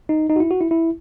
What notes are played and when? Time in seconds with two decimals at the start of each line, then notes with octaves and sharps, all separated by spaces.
0.09 D#4
0.30 D#4
0.36 F#4
0.40 E4
0.51 F#4
0.61 E4
0.71 E4